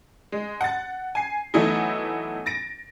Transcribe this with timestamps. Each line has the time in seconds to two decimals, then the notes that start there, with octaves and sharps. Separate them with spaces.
0.32 G#3
0.61 F#5 A6
1.15 G#5 C7
1.54 E3 F#3 A3 B3 D#4 E4
2.46 A6 A#6 D7